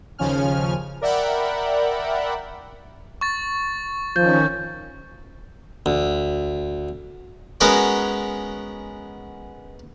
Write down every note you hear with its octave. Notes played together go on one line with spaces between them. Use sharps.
D#2 C#3 F3 C#4 G#5 F6
A#4 D5 E5 F#5 G5 B5
C#6 A6
D#3 F3 C#4 G6
D2
G#3 B3 C#4 F#4 A#4 C#5